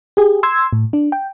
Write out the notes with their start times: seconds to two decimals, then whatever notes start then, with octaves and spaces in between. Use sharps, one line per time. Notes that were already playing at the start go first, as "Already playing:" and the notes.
0.17 G4 G#4
0.43 C6 E6 G#6
0.73 A2
0.93 D4
1.12 G5